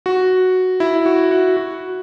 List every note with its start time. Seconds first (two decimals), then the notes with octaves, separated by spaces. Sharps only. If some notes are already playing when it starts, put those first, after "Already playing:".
0.06 F#4
0.80 E4
1.06 F#4
1.31 F#4
1.57 F#4